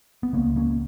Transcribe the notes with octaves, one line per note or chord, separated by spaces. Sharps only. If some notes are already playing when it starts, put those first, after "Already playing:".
B3
C#2 C#3 A#3 C#4
A#3 C#4